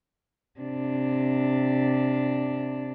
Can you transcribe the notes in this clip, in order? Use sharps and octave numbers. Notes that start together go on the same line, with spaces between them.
C3 D4